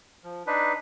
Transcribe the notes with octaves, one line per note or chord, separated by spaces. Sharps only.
F3
D4 D#4 B4